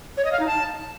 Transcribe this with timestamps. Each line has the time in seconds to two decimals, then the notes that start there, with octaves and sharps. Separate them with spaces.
0.17 C#5
0.25 D#5
0.32 F5
0.40 D#4
0.47 A5